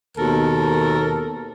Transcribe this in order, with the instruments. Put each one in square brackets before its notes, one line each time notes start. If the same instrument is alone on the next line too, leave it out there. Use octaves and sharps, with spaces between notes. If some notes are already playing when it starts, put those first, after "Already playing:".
[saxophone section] D#2 B2 A4 A#4